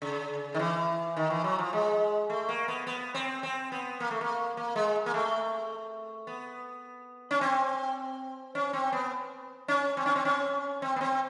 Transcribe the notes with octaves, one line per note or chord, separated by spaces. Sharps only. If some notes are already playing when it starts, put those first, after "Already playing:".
C#3
D#3
E3
D#3
E3
F#3
F3
G#3
A3
A#3
B3
B3
C4
C4
B3
A#3
A3
A#3
A#3
G#3
A#3
A3
B3
C#4
C4
C#4
C4
B3
C#4
C4
C#4
C4
C#4
C4
B3
C4